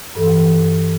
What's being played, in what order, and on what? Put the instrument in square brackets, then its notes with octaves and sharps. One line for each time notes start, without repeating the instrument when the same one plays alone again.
[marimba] G2 E3 A4